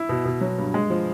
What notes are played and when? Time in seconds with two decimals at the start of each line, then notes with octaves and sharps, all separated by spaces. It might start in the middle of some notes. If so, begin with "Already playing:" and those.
Already playing: E4
0.09 B2
0.25 B2
0.41 F#3
0.58 G2
0.74 G#3
0.90 F3